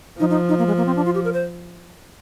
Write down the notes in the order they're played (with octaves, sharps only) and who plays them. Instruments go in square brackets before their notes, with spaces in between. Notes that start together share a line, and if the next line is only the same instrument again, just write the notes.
[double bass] F3 [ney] D#4
[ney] D#4
D#4
A#3
G#3
A#3
C4
D4
F4
G4
A#4
C5